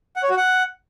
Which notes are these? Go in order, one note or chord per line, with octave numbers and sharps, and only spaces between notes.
F#5
C#5
F#4
F#5